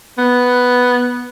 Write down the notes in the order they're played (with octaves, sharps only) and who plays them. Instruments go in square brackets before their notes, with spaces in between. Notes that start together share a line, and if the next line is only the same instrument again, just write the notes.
[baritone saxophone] B3